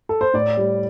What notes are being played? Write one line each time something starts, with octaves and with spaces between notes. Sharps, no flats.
A4
C5
A2 D5
G3